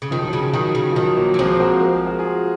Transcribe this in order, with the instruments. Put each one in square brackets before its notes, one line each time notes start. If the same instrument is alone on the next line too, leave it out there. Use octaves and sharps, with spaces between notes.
[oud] C#3
[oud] D#3 [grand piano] F3
[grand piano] F#3
F3
[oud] C#3
[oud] D#3 [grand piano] F#3
[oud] C#3
[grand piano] F3
[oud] D#3 [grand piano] F#3
[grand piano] F#3 A#3
[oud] F#3
[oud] F3 [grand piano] G#3 C4
[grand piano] F#4 A#4
A#4
G#4
F#4
F4 G#4